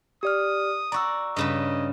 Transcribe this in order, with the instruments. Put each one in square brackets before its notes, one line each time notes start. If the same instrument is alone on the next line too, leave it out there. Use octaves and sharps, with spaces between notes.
[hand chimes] G4 D5 F6 [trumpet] D#6
[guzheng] F#4 D5 [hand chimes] A#5 C#6 E6
[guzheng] G2 C#3 G3 [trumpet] D#5